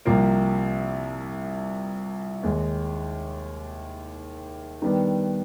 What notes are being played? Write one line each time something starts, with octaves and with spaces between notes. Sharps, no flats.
C2 C3 F3 A#3
D#2 D#3 G#3
D#3 G3 B3 D4